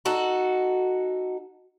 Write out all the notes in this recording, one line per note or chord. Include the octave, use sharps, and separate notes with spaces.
D#4 F#4 A4